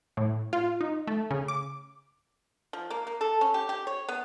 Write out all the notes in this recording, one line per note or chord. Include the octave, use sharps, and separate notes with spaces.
A2
F4
D#4
A3
C#3
D6
F3
A#3
A#3
A4
C#4
G4
G4
C#5
B3